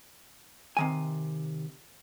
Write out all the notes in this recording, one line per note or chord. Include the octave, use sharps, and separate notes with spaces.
C3 D#3 G#5